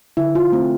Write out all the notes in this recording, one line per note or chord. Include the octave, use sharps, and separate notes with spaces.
D3 E4
F4
A3 C4